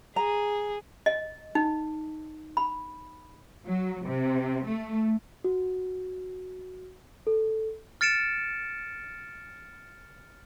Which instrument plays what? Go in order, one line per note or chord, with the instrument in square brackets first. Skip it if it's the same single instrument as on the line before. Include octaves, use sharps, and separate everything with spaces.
[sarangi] G#4 [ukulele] A#5
[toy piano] D#5
D#4
B5
[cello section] F#3
C3
A3
[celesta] F#4
A4
[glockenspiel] F6 A6 C#7 D7 E7